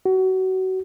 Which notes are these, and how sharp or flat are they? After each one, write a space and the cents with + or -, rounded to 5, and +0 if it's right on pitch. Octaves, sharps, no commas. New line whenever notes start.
F#4 +25